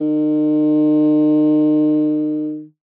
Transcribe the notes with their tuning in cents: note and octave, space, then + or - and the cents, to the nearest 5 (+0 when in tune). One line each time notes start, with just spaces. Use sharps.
D#3 -40